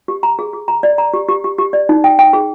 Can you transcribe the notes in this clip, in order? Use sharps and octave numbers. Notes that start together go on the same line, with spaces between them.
G4
A#5
G#4
G#4
A#5
D5
A#5
G4
G4
G4
G4
D5
D#4
G5
G5
G#4